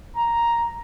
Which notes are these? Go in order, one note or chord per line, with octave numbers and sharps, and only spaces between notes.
A#5